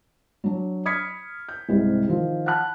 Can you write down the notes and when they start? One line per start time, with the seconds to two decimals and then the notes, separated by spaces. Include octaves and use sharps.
0.44 F#3 D4 C#5
0.85 B5 D#6 F6 G#6 B6 C#7
1.48 G6
1.69 C2 G#2 C3 G3
2.08 D#3 F3 F4
2.46 F#5 A5 B5 F#6